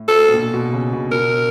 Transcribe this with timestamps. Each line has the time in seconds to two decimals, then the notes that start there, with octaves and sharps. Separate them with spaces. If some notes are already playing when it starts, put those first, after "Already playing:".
Already playing: A2
0.08 A4
0.29 B2
0.34 A#2
0.54 B2
0.73 C#3
0.93 B2
1.12 B2 A#4